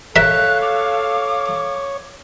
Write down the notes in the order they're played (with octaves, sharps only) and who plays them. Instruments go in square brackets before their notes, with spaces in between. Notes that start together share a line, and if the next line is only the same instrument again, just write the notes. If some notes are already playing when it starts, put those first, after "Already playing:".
[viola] A4 F5 [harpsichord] A#4 E5 [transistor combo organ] C#5 [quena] F#6
[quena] D6